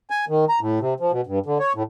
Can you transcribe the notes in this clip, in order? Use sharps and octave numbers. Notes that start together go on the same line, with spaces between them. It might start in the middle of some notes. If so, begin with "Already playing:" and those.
G#5
D#3
A#5
A2
C3
F3
B2
G2
D3
C#5
A2